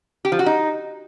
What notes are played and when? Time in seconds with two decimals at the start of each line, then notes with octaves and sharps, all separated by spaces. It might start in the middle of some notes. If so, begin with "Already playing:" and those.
0.25 G4
0.32 F3
0.39 F#4
0.46 D#4